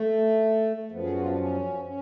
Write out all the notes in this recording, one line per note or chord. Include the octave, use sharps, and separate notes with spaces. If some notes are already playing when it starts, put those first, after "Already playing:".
Already playing: A3
A3
F#2 F3 B3
G#4
F#4
F4
D4
C#4
C#4